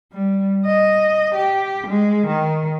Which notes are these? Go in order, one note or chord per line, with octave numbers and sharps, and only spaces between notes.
G3
D#5
G4
G#3
D#3